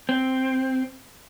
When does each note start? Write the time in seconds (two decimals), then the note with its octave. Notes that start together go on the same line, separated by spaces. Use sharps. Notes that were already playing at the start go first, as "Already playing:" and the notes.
0.09 C4